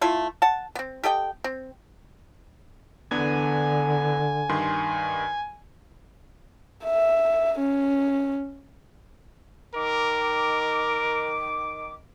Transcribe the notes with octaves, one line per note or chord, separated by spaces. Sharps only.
A3 E4 F4 A4
F#5 A5
B3 C4
G4 A4 D#5 G5
C4
E2 D3 B3 D4 G#5
G2 D#3 C6
E5
C#4
D#3 A#4 D6